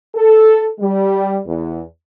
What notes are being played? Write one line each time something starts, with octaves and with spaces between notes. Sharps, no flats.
A4
G3
E2